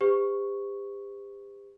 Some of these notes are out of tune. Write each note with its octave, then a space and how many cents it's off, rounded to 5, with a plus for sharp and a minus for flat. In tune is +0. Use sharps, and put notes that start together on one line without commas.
G4 +35 C5 -35 C#6 +0